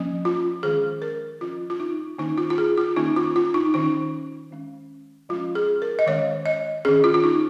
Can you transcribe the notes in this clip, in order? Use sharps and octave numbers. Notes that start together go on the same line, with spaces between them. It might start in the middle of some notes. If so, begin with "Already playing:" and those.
Already playing: F3 A#3 C#4
F4
D#3 G#3 C#4 G#4
A#4
F3 C#4 F4
F4
D#4
D#3 A#3 C#4 D#4
F4
F4
G#4
F4
D#3 A#3 C#4 D#4
F4
F4
D#4
D#3 C#4 D#4
D#3 G#3 C#4
F3 G#3 C#4 F4
G#4
A#4
D#5
D#3 G#3 C#4 C#5
D#5
D#3 C#4 G#4
F4
F4
D#4